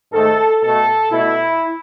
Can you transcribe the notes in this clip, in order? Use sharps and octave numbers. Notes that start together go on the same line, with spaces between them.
G#2 D#3 A3 A4
B2 A3 A4
B2 A3 E4